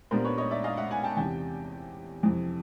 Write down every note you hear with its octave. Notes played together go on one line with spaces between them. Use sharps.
A#2 G3 B3 D4 A#4 C5
B4 C#5
C#5 D#5
D5 E5
D#5 F5
E5 F#5
F#5 G#5
G5 A5
E2 C3 D#3 G5 A5
F2 C3 E3